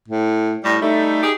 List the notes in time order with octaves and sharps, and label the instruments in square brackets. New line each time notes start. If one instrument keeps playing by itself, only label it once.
[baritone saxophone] A2
[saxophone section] A2 G3
[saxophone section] G3 A3 [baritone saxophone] D#4
[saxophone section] G4 G#4